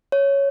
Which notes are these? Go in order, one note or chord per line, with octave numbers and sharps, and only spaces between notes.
C#5